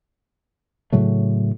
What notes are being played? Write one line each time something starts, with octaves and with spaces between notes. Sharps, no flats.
A2 C#3 F#3 A3